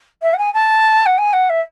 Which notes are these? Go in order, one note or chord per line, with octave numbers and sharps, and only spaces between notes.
E5
F#5
G#5
A5
F#5
G#5
F#5
E5